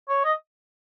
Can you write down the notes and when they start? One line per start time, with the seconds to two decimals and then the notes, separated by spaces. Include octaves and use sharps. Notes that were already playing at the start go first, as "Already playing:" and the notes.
0.09 C#5
0.24 D#5